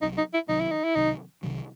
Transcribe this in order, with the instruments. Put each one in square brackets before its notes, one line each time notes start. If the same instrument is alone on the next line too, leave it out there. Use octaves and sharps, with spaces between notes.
[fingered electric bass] C2 C3 D#3 F#3 [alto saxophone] D#4
[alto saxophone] D#4
E4
[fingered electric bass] C2 C3 D#3 F#3 [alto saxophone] D#4
[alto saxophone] E4
D#4
E4
[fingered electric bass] C2 C3 D#3 F#3 [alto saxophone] D#4
[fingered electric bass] C2 C3 D#3 F#3